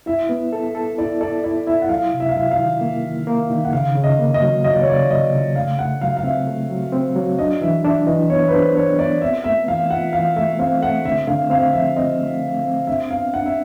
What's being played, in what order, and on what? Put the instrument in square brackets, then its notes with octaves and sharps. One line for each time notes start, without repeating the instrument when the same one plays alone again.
[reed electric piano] E4 [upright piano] E5
[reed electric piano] B3
A4
A4
[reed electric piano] E4 [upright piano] D5
[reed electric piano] A4 [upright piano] D5
[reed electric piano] E4 [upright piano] D5
[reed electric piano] E4 [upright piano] E5
[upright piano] F#5
[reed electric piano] F#3 [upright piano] F5
[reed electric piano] C3
[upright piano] E5
F5
[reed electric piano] F#3 [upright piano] E5
[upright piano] F5
[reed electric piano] D#3
A#3
D#3
A#3
D#3
[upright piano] F#5
[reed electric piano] C#3 [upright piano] F5
[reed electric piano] C#3
[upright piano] D#5
[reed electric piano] A#3
[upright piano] D#5
[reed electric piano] F#3
[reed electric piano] F#3 [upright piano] D#5
[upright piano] D5
C#5
[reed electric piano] C#3 [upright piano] D5
[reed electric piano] F#3 [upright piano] D#5
[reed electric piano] C#3
[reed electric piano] A3 [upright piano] F5
[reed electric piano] A3 [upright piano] F#5
[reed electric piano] F#3 [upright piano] F5
[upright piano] F5
[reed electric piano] C4 [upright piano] E5
[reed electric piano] A3
F#3
C4
F#3
[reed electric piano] D4 [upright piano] D#5
[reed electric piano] E3 [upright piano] E5
[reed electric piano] D4 [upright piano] E5
[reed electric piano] E3 [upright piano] D#5
[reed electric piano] B3 [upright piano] C#5
[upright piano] B4
[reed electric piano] D4 [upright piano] C5
[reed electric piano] D4 [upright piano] C#5
[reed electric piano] B3 [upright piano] D5
[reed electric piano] C4 [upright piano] E5
[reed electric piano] A3 [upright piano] E5
[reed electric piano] E3 [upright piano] F5
[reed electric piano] F4 [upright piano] F#5
[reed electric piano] E3 [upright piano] F5
[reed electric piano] A3 [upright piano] E5
[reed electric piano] C4 [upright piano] F5
[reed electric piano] A3 [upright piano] F#5
[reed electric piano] D3 [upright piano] E5
[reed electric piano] D3 [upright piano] F5
[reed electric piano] C4 [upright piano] F5
[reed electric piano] F3 [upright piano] E5
[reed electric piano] C4 [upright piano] D#5
[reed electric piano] A3
A3
C4
[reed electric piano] D4 [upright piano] E5
[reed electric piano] B3 [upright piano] F5
[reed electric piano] D4 [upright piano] F#5
[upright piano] E5